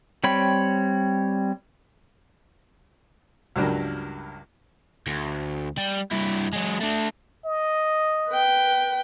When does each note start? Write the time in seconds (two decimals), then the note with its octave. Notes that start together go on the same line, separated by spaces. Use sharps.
0.24 G3 C4 C#5 G5 B5
3.56 C#2 G2 F#3 D4 G4 A#4
5.07 D2
5.78 G3
6.12 G2 E4
6.53 F#3 G#3
6.80 A3 D4
7.45 D#5
8.30 B4 G5